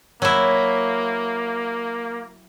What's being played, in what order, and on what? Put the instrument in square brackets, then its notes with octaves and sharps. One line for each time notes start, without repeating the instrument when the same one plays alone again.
[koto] F#3 E4 [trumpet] A#3